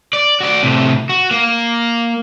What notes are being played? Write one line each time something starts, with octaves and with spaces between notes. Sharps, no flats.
D5
F#4 D5
A2 C3
F#4
A#3